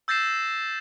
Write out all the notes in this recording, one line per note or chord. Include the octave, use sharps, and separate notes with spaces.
E6 G6 A6 A#6 C7 E7